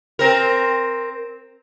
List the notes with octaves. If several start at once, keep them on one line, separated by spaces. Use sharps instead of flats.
C4 A#4